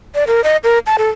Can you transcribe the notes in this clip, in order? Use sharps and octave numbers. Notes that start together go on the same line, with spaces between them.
D5
A#4
D#5
A#4
A5
A4